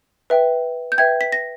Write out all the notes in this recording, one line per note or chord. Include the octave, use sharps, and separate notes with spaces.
B4 E5 G5
G6
B4 E5 G5 G#6
B6
A#6